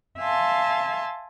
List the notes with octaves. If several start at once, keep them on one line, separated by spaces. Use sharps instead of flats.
E5 F5 G#5 A5 C6